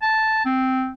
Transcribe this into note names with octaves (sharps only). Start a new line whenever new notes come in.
A5
C4